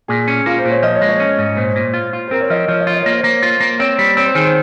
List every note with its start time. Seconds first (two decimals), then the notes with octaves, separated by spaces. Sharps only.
0.08 A#2 G#4
0.28 C#4
0.46 A#3 F4
0.58 C5
0.65 A#2
0.70 C#5
0.83 F3 D#5
0.95 C#5
1.02 G#3
1.08 C#5
1.20 C#4
1.38 G#2
1.57 A#2 C5
1.76 A#2
1.94 F4
2.13 F4
2.27 C5
2.31 C4 A#4
2.40 C#5
2.50 F3 D#5
2.68 F3 C#5
2.81 D#5
2.87 F4
2.94 D#5
3.02 A#3 C#5
3.12 C5
3.21 A#3 C#5
3.43 F4
3.60 A#3
3.79 C4 C#5
3.99 G3
4.17 C4 C#5
4.26 C5
4.35 D#3 G#4
4.45 C5